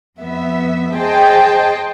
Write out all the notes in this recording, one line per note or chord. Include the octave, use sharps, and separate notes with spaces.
F2 B3 E5
G#4 C5 D#5 G5 A5